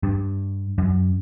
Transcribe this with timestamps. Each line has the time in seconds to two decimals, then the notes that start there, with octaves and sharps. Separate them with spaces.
0.03 G2
0.78 F#2